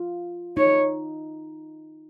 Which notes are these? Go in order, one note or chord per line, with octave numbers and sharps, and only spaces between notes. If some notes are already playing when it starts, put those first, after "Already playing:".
Already playing: F4
D#4 C#5